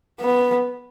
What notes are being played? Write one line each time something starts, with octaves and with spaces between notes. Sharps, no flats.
B3